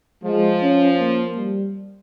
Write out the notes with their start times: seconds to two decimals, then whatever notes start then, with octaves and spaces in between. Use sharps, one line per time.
0.24 F3 G#3
0.62 C#4
0.99 A#3
1.37 G3